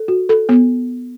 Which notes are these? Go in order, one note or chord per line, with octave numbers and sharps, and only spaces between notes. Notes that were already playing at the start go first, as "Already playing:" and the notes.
Already playing: A4
F#4
A4
B3